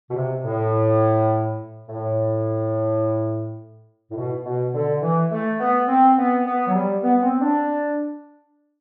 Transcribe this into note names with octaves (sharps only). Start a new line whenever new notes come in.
B2
C3
A2
A2
A2
B2
B2
D3
E3
A3
B3
C4
B3
B3
F#3
G3
B3
C4
D4